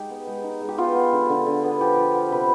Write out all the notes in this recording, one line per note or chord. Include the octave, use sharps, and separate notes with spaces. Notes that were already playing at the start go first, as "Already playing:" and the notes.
Already playing: G#3 D#4 G4
B3
G#3
D#4
G#3
G4
B3 F4
B3
D3
D3
D3
B3
F3 G4
F3
B3
C3 B4